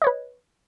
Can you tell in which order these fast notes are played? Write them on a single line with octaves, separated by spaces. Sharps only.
D#5 C#5 B4